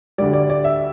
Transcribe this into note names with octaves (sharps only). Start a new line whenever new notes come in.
D2 D3 G3 D5
D5
D5
E5